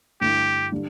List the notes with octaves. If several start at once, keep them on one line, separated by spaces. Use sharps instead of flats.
G2 D3 A3 E4 G4
D3 G3 D4